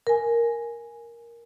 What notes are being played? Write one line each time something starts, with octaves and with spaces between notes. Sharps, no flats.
A#4 G#5